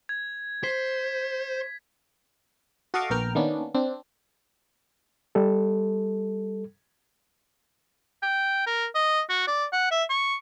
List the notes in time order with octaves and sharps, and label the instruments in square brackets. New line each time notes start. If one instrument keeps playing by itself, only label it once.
[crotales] G#6
[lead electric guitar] C5 [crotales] B6
[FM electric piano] F#4 A4 D#5 F5 C#6 D6
A#1 B3 A#4 G5 F6
D#3 A#3 B3 C#4 D4
C4 D4
[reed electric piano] G3 A4
[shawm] G5
A#4
D#5
F#4
D5
F#5
E5
C#6